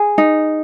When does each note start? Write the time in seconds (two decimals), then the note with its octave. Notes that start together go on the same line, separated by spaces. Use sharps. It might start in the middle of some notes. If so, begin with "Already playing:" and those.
Already playing: G#4
0.18 D#4